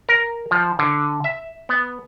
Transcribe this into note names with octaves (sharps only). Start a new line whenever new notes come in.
A#4
F3
D3
E5
B3